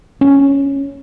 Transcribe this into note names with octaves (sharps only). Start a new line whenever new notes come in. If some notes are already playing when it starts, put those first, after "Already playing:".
C#4